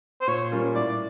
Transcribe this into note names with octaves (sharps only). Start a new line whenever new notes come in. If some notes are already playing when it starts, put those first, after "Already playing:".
C5
A#2 C#5
G3 A#3 C#4 F4
A2 D5